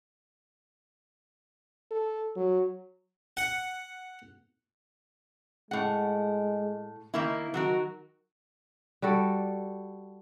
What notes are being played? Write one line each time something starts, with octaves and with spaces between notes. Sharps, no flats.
A4
F#3
F#5
A2 G#3 F#5
D#3 A#3 E4
D#3 F#3 F#4 A#4
G3 F#4 A4 D5